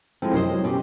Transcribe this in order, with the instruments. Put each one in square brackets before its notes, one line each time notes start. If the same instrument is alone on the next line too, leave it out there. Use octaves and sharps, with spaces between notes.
[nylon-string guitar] F3 G#3 [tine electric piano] C4 E4 A4
[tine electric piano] F#2 C3 [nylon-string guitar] E4 C5 D#5
[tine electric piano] F#3
[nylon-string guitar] B2 [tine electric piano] C#4 G4